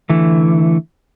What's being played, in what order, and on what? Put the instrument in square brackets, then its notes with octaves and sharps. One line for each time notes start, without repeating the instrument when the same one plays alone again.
[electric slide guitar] D3 E3 A3